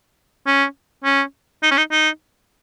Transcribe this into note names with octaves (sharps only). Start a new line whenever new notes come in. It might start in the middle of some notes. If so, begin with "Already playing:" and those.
C#4
C#4
D#4
C#4
D#4
D#4